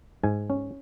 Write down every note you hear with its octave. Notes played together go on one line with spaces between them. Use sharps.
G#2 G#5
C#4